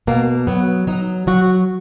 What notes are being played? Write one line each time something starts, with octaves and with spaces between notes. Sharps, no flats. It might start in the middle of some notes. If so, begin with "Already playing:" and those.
B2 A#3
F#3 B3
F#3 D#4
F#3 F#4